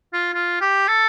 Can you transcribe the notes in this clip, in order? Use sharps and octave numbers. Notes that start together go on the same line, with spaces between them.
F4
F4
G4
A4